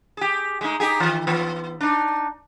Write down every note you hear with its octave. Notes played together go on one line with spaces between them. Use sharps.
G4 G#4
G#3 A3 D#4
D#4 G4 G#4
D#3 E3
E3 B3
D4 D#4